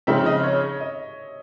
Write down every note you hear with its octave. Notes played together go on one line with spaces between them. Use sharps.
C#3 F3 G#3 C4 D#4 E5
D#5
C#5
D#5